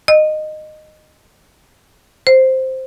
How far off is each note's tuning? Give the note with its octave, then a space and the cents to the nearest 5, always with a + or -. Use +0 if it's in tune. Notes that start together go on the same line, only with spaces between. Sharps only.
D#5 -15
C5 +0